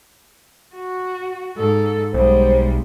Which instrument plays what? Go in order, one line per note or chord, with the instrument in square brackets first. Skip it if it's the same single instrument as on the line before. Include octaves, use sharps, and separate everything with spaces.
[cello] F#4
G#2 A4
[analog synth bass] B1 [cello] G3 G#3 [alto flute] C5